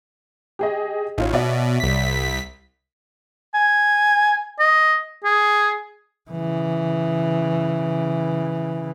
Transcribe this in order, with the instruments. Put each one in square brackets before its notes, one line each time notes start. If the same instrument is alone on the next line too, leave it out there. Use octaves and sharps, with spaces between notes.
[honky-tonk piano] G4 G#4 D#5
[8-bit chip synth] A1 [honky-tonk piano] D#4 F4 C#5
[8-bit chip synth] B2 [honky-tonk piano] C#5 D5 E5
[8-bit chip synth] C2 B6
[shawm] G#5
D#5
G#4
[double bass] C#3 E3